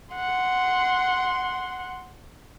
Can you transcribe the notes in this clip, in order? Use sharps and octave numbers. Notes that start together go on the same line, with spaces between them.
F#5 C6